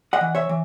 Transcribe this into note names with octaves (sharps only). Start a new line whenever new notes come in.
D#5 F#5
E3
C#5 E5
E3